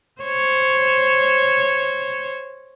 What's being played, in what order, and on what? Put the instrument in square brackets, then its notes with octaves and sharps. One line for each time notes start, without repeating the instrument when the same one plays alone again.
[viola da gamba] C5 C#5